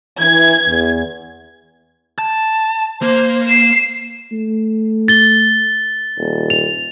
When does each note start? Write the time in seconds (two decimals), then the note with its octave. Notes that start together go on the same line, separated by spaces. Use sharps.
0.19 E3 G#6
0.66 E2
2.19 A5
3.02 A#3 C5
3.45 C7 E7
4.32 A3
5.08 A6 G7
6.18 D#1
6.50 F7